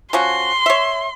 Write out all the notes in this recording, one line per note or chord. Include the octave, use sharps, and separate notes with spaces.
F3 C#4 F#4 C6
C#5 E5